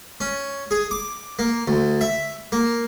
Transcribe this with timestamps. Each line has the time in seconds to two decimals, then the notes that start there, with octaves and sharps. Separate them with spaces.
0.21 C#4
0.71 G#4
0.91 D6
1.39 A#3
1.68 D2
2.01 E5
2.52 A#3